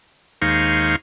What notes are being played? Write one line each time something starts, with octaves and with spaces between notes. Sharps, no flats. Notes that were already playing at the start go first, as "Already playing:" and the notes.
D#2 G#3 D#4 C5 F5 C#6